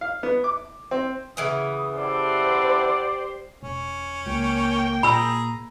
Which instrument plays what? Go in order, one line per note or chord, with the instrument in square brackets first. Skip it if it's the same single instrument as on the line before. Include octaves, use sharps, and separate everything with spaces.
[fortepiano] F5
B3
D6
C4
[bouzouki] C#3 E3 B3 [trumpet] D#6
[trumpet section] E4 A4 F#5 [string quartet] G4 C5 [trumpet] D5
[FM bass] E1 [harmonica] C#4
[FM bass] C#2 [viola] A#3 G5
[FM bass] A#2 [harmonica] G#4 A#5 [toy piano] B5 E6